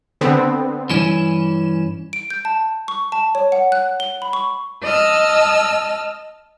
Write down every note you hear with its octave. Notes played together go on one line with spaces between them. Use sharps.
D3 B3 C4
G2 E3 C#4 E7
D7
G6
A5
C#6
A5
C#5
F#5
F#6
G7
B5
C#6
D#5 A5 E6 F6